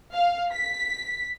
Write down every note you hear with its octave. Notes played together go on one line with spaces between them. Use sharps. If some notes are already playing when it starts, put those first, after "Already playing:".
F5
B6